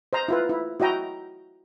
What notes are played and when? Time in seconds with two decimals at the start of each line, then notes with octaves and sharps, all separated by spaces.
0.13 C5 D#5 A#5
0.28 E4 F4 B4
0.49 E4
0.80 E4 F#4 D#5 G5 A#5